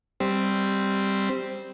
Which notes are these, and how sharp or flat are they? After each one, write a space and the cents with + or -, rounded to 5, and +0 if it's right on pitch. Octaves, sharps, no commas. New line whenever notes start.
G3 +0 C4 +0